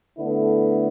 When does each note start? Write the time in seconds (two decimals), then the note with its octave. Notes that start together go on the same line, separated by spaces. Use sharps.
0.19 D3 A3 B3 E4